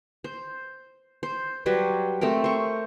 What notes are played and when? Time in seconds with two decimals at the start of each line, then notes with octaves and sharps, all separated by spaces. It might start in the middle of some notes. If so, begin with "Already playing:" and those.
0.24 C5
1.23 C5
1.66 F#3 G3 B4 C5
2.21 A3 C4 A4 A#4
2.44 C5 C#6